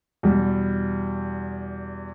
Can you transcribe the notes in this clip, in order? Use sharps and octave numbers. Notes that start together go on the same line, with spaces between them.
E2 B2 G3